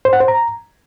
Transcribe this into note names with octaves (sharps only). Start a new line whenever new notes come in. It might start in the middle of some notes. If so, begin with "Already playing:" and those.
C5
F#5
C5
A#5